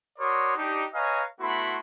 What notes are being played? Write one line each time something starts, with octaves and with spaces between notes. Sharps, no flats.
F#4 A#4 C#5 D5 C6 D#6
D4 D#4 G4
B4 C#5 D#5 F5 G#5 A#5
A3 B3 E4 F#4 B5 C6